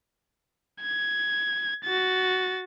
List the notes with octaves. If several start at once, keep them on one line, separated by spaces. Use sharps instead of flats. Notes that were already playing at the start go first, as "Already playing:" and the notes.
G#6
F#4 A6